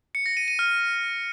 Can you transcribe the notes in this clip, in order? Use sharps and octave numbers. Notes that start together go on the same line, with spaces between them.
C#7
A#6
D#7
D#7
F6